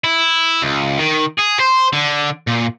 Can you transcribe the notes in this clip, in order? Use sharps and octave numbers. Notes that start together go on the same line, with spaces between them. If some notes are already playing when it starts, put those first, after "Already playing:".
E4
C#2
D#3
G#4
C5
D3
A#2